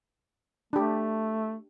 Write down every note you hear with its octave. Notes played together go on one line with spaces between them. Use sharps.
A3 D4 G4